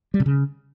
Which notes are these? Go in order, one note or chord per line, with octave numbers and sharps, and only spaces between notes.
G3
C3
C#3